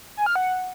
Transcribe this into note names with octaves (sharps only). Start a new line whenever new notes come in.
G#5
F6
F#5